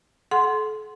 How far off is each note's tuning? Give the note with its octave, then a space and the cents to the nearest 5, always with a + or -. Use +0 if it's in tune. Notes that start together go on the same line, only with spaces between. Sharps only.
A4 -45 F#5 +0 C6 -5